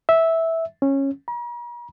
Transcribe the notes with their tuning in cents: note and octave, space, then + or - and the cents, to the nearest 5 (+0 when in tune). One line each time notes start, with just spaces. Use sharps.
E5 -10
C#4 -15
A#5 +45